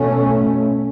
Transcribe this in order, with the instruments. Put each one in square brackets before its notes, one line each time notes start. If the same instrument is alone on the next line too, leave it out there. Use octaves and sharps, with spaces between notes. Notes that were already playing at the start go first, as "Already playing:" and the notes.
Already playing: [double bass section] B2 A3 C#4